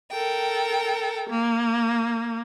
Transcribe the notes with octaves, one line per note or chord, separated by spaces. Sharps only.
A4 A#4 G5
A#3